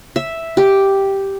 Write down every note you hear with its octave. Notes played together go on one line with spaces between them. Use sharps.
E5
G4